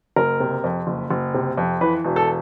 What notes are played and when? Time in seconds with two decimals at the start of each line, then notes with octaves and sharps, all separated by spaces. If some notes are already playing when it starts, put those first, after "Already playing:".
0.16 F#1 A#4
0.40 C3
0.64 F2
0.87 F#1
1.11 F#1
1.34 C3
1.57 F2
1.81 E3 B4
2.05 E1
2.16 A4